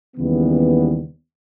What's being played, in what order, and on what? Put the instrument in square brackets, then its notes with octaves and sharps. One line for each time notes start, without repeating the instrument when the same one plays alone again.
[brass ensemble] D#2 C#3 E3 G3 B3